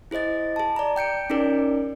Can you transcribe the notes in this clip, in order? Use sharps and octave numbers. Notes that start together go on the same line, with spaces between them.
E4 G#4 C5 D#5 A6
G#4 A5
D5 A#5
G5 G6 C#7 D7
C#4 D#4 G#4 A#4 D5